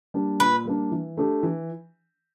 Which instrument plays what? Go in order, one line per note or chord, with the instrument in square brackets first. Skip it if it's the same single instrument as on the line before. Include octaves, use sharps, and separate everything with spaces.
[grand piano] G3 A#3 D4
[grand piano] A#2 [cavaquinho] B4
[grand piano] G3 A#3 D4
E3
A3 D4 G4
E3